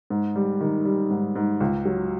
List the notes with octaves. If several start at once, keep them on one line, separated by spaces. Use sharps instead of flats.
G#2
G3
D#3
G3
G#2
G#2
C#2
F#3